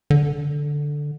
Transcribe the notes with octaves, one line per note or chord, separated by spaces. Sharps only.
D3